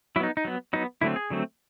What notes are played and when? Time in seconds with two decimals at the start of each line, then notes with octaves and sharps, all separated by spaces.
0.16 F#3 E4
0.20 B3 D#4
0.37 D#4
0.45 F#3 B3
0.73 F#3 B3 D#4
1.01 D3 F#3 A3 C4 E4
1.16 G#4
1.30 D3 F#3 A3 C4